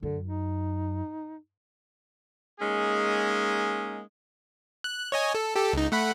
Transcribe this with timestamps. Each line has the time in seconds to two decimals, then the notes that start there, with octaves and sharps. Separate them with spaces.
0.03 F#2 D3
0.27 D#4
2.60 G#3 A#3 C#4 D#4 G#4
4.84 F#6
5.12 C#5 D#5 G#5
5.35 A4
5.56 G4 A4
5.73 C#2 D#4
5.92 A3 F#5 B5